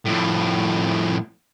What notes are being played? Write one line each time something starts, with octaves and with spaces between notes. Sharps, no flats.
F2 A2